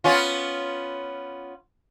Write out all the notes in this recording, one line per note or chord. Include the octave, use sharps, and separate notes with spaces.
B3 C#4 F4